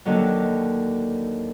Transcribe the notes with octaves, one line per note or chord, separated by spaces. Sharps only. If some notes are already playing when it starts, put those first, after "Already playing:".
D#2 D3 F#3